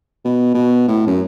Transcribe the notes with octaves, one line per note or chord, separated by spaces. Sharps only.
B2
B2
A2
F#2